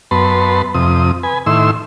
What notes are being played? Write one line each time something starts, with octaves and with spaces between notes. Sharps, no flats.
F#2 B3 B4 A5 C6
F2 C3 D#6
B4 G#5
A2 D#3 E4 C6 E6